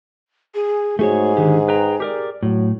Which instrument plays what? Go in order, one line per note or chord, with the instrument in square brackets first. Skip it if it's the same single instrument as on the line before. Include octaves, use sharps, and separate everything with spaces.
[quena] G#4
[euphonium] G#2 [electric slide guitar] A3 F#4 C#5 [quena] G#4
[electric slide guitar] D3 D#3 G4
B4 G5 A#5
G4 A#4 D5
[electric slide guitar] A2 [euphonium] F#3